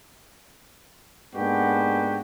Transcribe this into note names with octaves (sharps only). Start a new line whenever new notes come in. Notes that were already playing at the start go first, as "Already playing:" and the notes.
G#2 A#3 B3 D4 F#4 G4